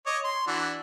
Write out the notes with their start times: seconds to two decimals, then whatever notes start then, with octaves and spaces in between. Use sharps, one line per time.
0.06 C#5 D#5 D6
0.24 C6
0.47 E3 D4 F#4